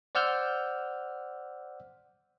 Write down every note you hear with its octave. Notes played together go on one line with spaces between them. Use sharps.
C5 D5 F#5 E6 F6 G6